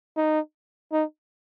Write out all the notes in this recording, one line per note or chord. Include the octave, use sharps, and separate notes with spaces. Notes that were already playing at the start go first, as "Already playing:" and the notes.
D#4
D#4